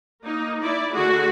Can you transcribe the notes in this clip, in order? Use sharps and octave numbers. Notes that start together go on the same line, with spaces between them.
A#3 D#4
E4 D5
D3 A3 F#4 G#4